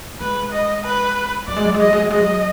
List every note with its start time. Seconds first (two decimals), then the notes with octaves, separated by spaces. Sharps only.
0.20 G#3 B4
0.52 D#5
0.84 B4
1.47 F#3 D5
1.56 G#3
1.65 F#3
1.74 G#3
1.79 F#3 D#5
1.93 G#3
2.02 F#3
2.10 G#3 D#5
2.20 F#3